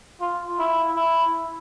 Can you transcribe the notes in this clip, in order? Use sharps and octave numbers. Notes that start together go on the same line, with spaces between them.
F4
E4
E4